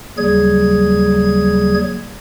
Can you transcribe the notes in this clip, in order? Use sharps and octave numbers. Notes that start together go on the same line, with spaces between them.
D#2 C#3 F#3 G3 G#4 G#6